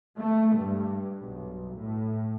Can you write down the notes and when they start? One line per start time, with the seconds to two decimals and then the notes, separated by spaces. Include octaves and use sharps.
0.18 A3
0.57 G2
1.21 B1
1.76 A2